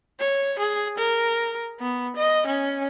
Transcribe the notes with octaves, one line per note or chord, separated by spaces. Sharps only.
C#5
G#4
A#4
B3
D#5
C#4